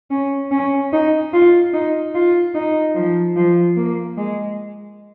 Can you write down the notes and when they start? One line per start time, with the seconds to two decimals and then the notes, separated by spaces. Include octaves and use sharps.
0.11 C#4
0.51 C#4
0.92 D#4
1.33 F4
1.73 D#4
2.15 F4
2.55 D#4
2.96 F3
3.37 F3
3.77 A#3
4.18 G#3